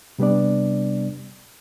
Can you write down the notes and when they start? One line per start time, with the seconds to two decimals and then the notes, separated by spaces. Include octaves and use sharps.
0.19 C3 G3 B3 D4 D5